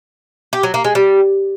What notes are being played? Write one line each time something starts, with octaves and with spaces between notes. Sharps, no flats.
G4
F#3
A#3
G#3
G3